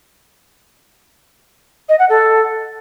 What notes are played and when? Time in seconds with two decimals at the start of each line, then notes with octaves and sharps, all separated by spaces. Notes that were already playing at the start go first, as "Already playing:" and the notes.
1.89 D#5
1.99 F#5
2.09 A4